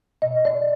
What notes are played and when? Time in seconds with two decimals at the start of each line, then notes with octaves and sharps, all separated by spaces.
0.22 B2 D#5
0.45 D5